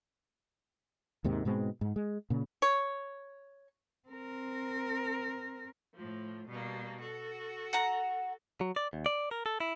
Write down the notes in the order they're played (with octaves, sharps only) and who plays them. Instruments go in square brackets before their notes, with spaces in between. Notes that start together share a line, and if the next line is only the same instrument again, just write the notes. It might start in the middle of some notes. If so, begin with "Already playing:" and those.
[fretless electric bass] D#2 G#2 C3 D#3
G#2 B2 G#3 C4
G#2
G#3
A#2 C#3
[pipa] C#5
[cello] C4 A#4
[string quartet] A2 F3
B2 G3 A#3
F#4 A4
[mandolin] F#5 A#5
[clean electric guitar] F#3
D5
D#2
D5
A#4
A4
E4